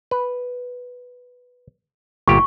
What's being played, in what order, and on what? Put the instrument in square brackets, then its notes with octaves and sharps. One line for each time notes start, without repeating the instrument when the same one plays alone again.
[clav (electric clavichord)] B4
[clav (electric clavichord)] G1 A#2 G4 [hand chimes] C#6